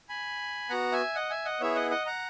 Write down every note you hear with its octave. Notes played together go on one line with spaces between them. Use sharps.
G#5 B5
B3 F#4 F#5 A#5
E5 G#5
D#5 F#5
E5 G#5
D#5 F#5
B3 E4 G#4 C#5 E5
D#5 F#5
D#5 F#5
F#5 A#5